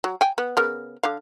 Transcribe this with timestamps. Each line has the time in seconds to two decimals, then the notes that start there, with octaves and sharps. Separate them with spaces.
0.04 F#3
0.21 G5 G#5
0.38 B3
0.57 C#3 B3 A#4
1.03 D3 D4 F5